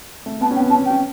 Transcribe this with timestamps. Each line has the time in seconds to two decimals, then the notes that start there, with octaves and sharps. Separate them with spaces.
0.26 A3
0.41 B3 A5
0.51 C#4 G5
0.60 B3
0.69 C#4 A5
0.80 B3 G5
0.90 C#4